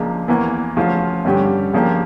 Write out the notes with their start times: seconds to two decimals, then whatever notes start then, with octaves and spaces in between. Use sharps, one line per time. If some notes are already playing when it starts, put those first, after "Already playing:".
Already playing: C#2 C#3 F3 A#3 D4
0.28 E2 E3 A#3
0.77 D2 C#3 F3 C#4 F4
1.25 G2 D3 G3 C#4 G4
1.74 C#3 F3 A#3 D4 G4